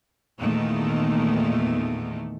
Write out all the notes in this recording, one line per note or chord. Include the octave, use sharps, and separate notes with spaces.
E2 A#2 D#3 A3